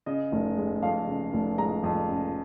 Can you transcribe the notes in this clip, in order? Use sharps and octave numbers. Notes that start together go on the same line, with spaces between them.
C#3 D#5
F1
G#3
F2 F5
C#3
F1
G#3 A#5
F2
C#3